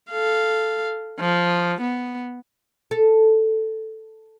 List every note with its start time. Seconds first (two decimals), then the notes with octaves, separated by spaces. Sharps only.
0.11 A4 F5
1.20 F3
1.81 B3
2.91 A4